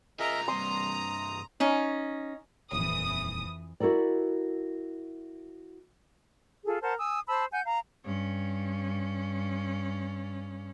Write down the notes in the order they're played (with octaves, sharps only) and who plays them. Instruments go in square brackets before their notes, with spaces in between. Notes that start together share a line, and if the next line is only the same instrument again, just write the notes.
[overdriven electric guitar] F4 G#4 [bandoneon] A#4 D#5 E5 [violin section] A#5
[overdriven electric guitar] G2 C3 [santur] C6 [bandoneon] D#6
[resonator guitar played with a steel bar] C#4 D#4
[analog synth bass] D#1 [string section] F2 E3 D#6
[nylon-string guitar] E4 F#4 A4 A#4 D5
[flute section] F4 G#4 A4
A#4 C5 F#5 A5
G#5 D#6 E6
C5 A5 B5 E6
F#5 G#5 G6
F5 A#5
[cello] G2 C#4